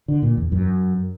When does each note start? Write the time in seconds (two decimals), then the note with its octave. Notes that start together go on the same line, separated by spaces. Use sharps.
0.08 D3
0.22 A#2
0.37 E2
0.52 F#2